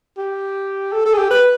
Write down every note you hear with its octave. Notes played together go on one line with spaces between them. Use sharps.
G4
A4
A4
G#4
G4
B4